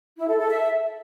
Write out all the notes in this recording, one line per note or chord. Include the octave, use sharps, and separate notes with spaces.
E4
A4
A4
E5